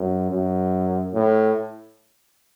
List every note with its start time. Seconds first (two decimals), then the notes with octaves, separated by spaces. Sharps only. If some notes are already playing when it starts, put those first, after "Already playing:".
Already playing: F#2
0.31 F#2
1.14 A2